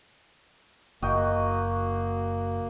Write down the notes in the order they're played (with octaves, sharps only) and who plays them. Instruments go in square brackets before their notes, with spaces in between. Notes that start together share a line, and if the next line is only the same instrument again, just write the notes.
[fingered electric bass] F#1 [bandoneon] A#3 [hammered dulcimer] F#4 D#5 G5